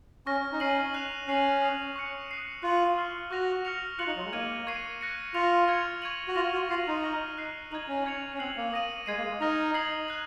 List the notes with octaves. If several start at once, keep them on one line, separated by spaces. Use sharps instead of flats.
C#4 C#6 F6 A#6
D#4
C#4 F6 C7 D#7 F#7
F#6 C7 F7
C#4 F#6 C7 D#7 F#7
D#6 F#6 C7 F7
C#6 F#6 C#7
D#6 F#6 C7 D#7
F4 F#6 C#7 F#7
C#6 F6 C7
F#4 C#6 F#6 A#6 F7
F6 A#6 C#7 F7
F4 F#6 C#7 F#7
D#4
F#3
G#3
A#3 F6 G#6 D#7 F#7
C#6 G#6 C7 D#7
F#6 A#6 C#7
F4 F6 A#6 C#7 F7
F6 G#6 C#7 F7
C#6 G#6 D#7 F#7
F#4
F4 F6 A#6 F7
F#4
F4 F6 C7 D#7 F#7
D#4
C#6 F6 A#6 F7
F#6 C7 F7
D#4 G#6 D#7 F#7
C#4
C#6 G#6 C#7 F7
C#4
C4 F#6 C7 F#7
A#3
D#6 A#6 D#7 F#7
G#3 G#6 C7 D#7
A#3
G#3
D#4 F6 A#6 F7
D#6 G#6 C7 F#7
F#6 C7